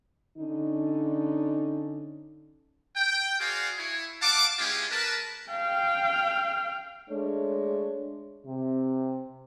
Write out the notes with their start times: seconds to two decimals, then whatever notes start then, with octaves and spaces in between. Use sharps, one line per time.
0.38 D3 C#4 D#4
2.96 G5
3.39 F#4 G#4 C5 D5 F5
3.78 E4 C#5 G#5
4.22 F5 F#5 A5 D6
4.59 G#3 C#4 E4 F4 G4 G#4
4.90 A#4 B4 A5
5.50 F5 G5
7.09 G#3 A3 D4 C#5
8.46 C3